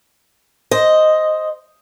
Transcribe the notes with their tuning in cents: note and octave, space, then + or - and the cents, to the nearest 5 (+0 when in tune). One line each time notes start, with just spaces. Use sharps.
C5 +0 D#5 +0